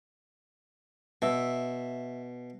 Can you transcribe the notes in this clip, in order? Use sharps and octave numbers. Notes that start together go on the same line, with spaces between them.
B2 E5